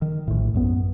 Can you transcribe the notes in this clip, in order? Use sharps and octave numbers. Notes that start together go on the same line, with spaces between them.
D#3
A#1 A2
B1 F#2 B3